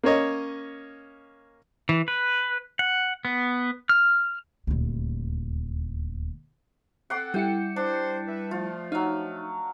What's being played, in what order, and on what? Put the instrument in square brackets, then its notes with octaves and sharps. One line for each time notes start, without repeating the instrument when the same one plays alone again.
[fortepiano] A#3 C#4 C#5 D#5
[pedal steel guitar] E3
B4
F#5
B3
F6
[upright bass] D#1 D2
[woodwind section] C4 A4 [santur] F#5 C6 D6
[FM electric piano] G3 E4 C#7 [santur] G5
[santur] D4 [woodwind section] C5
[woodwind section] B4 E5
[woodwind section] F3 A3 [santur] F4
[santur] F#3 F5 [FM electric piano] D#4